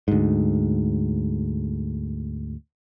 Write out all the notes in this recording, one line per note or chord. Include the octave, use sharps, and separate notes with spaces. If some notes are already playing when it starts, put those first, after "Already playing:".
D2 G#2